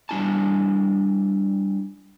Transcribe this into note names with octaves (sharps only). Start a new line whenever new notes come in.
G3 D4 E4 G#5 A5